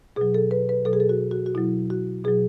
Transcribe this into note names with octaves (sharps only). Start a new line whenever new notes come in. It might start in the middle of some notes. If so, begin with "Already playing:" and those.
B2 F#3 G#4
A4
B4
B4
B2 F#3 A4
G#4
A4
F#4
F#4
F#4
B2 F#3 E4
F#4
B2 F#3 G#4